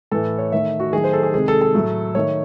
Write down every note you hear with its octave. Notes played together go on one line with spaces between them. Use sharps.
A2 E3 A3 A4
C#5
D#3 A3 E5
F#4
D#3 F#3 A3 G#4
C5
A4
G#4
C3 D#3 G#3 G#4
A4
A4
A2 F#3 A3
D#3 A3 C#5